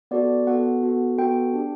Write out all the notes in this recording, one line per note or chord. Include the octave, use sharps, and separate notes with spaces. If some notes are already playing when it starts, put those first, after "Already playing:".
B3 F#4 A4 D5
B3 F#4 A4 F#5
B3 F#4 A4
B3 F#4 A4 G5
D4 G4